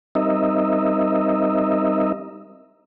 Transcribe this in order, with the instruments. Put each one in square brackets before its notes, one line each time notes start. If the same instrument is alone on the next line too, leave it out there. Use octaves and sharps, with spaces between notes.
[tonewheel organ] G3 C4 D#4 A#4 D#5 E5